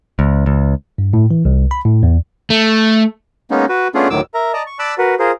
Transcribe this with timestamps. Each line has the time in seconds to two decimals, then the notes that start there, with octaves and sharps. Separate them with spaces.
0.19 C#2
0.46 C#2
0.98 G2
1.13 A2
1.31 E3
1.45 C2
1.71 B5
1.85 A2
2.03 E2
2.50 A3
3.51 G#3 A#3 B3 C#4 D#4
3.69 F#4 B4
3.95 A3 B3 C#4 D4 F4 G#4
4.10 D2 A2 D#3 F#3 D6 E6
4.34 A#4 E5 A#5
4.53 D5 D#5 A5 A#5
4.67 C#6
4.79 D5 A5 B5 D6 E6 F#6
4.98 F#4 A#4 B4
5.19 F4 G#4 A#4 C5